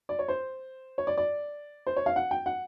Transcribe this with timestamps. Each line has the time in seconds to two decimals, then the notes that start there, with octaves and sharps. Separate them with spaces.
0.09 D5
0.19 C#5
0.28 C5
0.98 C#5
1.07 D5
1.18 D5
1.87 C5
1.96 C#5
2.06 F5
2.16 F#5
2.31 G5
2.46 F#5